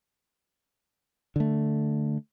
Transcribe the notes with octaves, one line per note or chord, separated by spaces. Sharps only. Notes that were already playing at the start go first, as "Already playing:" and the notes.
D3 A3